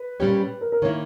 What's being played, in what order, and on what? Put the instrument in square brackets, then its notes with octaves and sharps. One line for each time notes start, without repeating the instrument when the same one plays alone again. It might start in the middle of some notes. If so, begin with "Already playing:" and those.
Already playing: [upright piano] B4
[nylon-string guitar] A#2 G3 C#4 G4 C#5
[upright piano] A#4
A#4
[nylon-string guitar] D#3 A#3 E4 [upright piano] C#5